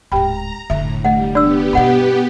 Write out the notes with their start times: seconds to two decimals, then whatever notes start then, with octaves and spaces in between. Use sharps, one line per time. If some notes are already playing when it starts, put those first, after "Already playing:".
0.12 D1 G#2 G4 G5 A#5 B5
0.70 F1 A2 D3 E5
1.05 G3 A3 D#5 F#5
1.35 B3 D4 G4 D5 E6
1.73 G2 B2 D#5 F#5 B5